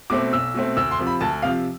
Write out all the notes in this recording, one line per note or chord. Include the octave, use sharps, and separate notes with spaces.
B2 A3 C4 D6
B1 E6
B2 A3 C4
D2 E6
C6
C3 F3
B5
D2 A5
C3 F3 F5